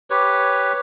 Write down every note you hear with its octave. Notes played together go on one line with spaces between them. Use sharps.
G4 B4 C#5